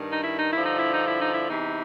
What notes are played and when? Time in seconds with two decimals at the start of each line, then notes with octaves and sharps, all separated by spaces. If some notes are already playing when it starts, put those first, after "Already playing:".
Already playing: G2 D#3
0.09 D#4
0.23 E4
0.36 D#4
0.50 E4
0.56 G2 D3 F3
0.64 D#4
0.78 E4
0.92 D#4
1.05 E4
1.19 D#4
1.32 E4
1.46 E2 C3 E3 D#4